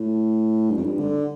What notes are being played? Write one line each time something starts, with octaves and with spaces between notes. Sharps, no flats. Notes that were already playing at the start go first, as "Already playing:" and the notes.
Already playing: A2
G2
F2
G2
D3